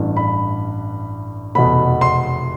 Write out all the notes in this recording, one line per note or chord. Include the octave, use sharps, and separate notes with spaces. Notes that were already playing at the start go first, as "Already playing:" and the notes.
Already playing: A1 G2 E3
B5
F1 E2 B2 B5
C6